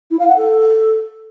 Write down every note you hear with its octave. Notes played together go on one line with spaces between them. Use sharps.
E4
F5
F#5
A4